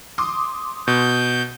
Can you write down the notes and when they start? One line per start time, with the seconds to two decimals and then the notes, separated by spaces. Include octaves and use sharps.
0.18 C6 D6 D#6
0.88 B2 G6